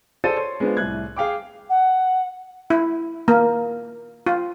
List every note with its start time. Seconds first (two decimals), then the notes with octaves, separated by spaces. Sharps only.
0.24 G#4 A4 C5 D5 A6 D#7
0.37 C#5 C6
0.60 G#3 B3 D4 F4 C5
0.77 C2 A2 F#6 G#6
1.16 G#4 F5 G5 D6
1.69 F#5
2.70 E4
3.28 A#3
4.26 F4